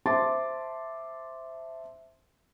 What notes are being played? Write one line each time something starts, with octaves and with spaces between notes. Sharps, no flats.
C5 E5 A5 C6 D6 A6